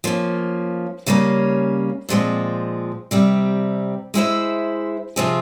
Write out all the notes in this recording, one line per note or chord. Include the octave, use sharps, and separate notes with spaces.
F3 A#3 C#4
C#3 G3 A#3 C#4
A#2 F3 G#3 C4
C3 G3 C4
G#3 E4 G4 C5 E5
C3 F3 C4 F4 G#4